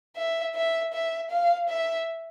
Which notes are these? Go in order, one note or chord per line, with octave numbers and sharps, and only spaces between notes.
E5
E5
E5
F5
E5